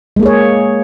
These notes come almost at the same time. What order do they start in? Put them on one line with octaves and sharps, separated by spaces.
G#3 A#3 G#4 C#5